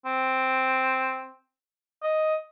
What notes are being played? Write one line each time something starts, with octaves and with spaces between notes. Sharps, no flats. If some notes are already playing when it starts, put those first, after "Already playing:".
C4
D#5